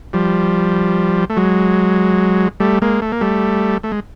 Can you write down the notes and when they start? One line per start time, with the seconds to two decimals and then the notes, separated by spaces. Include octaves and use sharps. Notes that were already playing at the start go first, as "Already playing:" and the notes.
0.13 F3 G3
1.30 A3
1.37 F#3 G#3
2.60 G3 A3
2.82 G#3 A#3
3.02 A3
3.12 A#3
3.21 G3 A3
3.83 A3
3.92 G#3